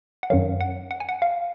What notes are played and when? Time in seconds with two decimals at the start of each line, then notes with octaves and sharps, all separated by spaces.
0.23 F#5
0.30 F#2 D#3 F#3 F5
0.60 F#5
0.91 F#5
1.00 G#5
1.09 F#5
1.22 F5